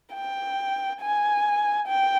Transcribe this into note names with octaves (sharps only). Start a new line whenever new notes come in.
G5
G#5
G5